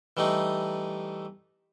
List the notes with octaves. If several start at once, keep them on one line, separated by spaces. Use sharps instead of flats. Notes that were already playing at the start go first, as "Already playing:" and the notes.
E3 G3 A3 D#4